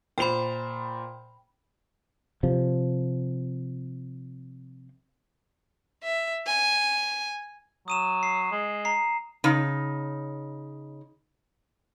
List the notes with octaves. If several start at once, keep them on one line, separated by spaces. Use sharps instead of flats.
A#2 C5 G5 B5 F7
C3 F3
E5
G#5
F#3 D#6 D#7 E7
C7
G#3
A#5 C7
C#3 D#4